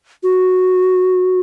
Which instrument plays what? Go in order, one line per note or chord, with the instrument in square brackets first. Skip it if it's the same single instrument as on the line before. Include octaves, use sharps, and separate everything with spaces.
[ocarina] F#4